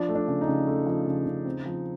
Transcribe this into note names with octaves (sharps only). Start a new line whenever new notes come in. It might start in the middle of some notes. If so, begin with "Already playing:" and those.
Already playing: F3 D4
A3
D4
C#3
D#4
C#3
A3
F3
C#3
C#3
C4
F3